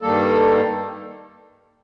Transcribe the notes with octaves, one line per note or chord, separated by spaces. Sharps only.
G2 D#3 G3 A#3 A4